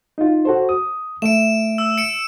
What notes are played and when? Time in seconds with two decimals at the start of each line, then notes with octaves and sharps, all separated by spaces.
0.18 D#4 F4
0.45 F#4 A4 C5
0.69 D#6
1.22 A3 E5 D7 E7
1.78 E6
1.98 C#7 D7